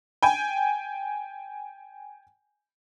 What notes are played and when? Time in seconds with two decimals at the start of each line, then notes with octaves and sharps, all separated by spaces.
0.23 G5 G#5